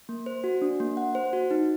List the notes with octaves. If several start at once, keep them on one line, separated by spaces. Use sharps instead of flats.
A#3
C5
F#4
D4
A#3
F#5
C5
F#4
D#4